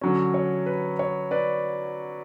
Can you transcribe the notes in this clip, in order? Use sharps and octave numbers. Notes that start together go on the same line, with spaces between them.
D3 F#3 C#4
C#5
B4
C#5
B4 D5